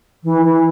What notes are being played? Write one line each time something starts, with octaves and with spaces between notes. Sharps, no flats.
E3
E3